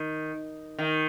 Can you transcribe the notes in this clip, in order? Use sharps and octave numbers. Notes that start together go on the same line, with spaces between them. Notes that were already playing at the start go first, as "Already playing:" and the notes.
Already playing: D#3
D#3